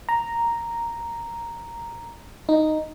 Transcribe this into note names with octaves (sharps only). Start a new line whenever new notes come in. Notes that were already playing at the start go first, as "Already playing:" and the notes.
A#5
D#4